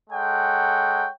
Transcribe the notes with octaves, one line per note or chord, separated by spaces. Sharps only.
G#3 A4 C#5 F#5 G5